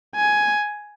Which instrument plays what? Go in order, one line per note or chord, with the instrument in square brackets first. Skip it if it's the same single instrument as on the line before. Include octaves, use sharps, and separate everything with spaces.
[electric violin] G#5